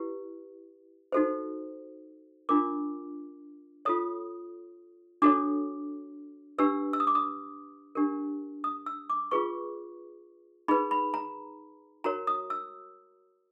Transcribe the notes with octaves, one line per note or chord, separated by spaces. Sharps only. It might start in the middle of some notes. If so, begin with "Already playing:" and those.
Already playing: E4 G4 B4
D#4 F#4 A4 C5
D4 F4 A#4 D6
F4 A4 C#5 D#6
D4 F#4 A4 C#5 D6
D4 G4 B4 E6
E6
D#6
D6
D#6
D4 G4 A#4
D#6
E6
D6
F4 G#4 B4 C#6
D#4 G#4 B4 B5
B5
A#5
F#4 A#4 C#5 A#5
D#6
E6